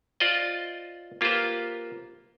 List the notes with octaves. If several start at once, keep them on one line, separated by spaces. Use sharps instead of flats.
F4 C5 D5 D#5
A#3 F4 G4 B4 C5